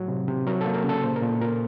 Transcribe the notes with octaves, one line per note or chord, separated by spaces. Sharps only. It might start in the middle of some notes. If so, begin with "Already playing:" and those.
Already playing: A2 F#3
C3
C3
F#3 A#4
A4
A#3
A#4
C#3 A4
A#2 C5
A#4
A#2
A4
A#2 A#4